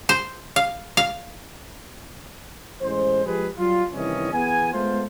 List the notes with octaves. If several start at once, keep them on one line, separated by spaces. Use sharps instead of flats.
C5
F5
F5
A1 G#3 C5
F3 G#3 G4 G#4 B4
F#3 G3 F4
C2 D#3 E3 C#4 D#5
E2 B3 G#4 G#5
G#3 A3 B3 F4 C5